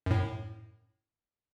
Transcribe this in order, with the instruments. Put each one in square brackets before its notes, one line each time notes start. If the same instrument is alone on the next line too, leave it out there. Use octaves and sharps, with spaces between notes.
[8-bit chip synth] F#2 A2